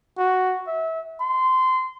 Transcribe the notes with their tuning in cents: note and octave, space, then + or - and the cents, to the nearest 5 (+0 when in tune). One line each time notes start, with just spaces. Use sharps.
F#4 +5
E5 -25
C6 -20